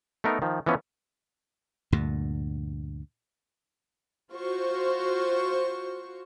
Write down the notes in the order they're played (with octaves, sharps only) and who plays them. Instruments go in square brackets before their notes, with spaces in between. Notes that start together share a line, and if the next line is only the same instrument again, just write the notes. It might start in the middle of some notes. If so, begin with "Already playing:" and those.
[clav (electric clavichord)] A3 B3 D#4 A#4
D#3 F3
E3 F3 B3 C#4
[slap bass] D2 G2 A#2
[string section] F4 F#4 C5 C#6